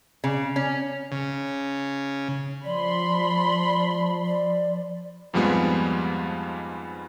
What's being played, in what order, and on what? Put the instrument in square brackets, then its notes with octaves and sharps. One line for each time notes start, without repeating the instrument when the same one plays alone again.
[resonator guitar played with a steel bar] C#3
C#4
[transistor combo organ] C#3
[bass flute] F3 [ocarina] D5 [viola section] B5 C6
[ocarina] D5
[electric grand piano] F2 G#2 F3 G3 G#3 B3